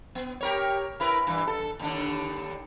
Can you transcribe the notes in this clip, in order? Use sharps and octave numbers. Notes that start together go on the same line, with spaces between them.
B3
G4 A#4 C#5
E4 A#4 B4
G2 E3
A4
D#2 D3 D4